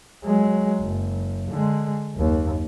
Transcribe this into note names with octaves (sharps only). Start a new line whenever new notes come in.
F#3 G#3
F#1
D3 G#3
F#1 D#2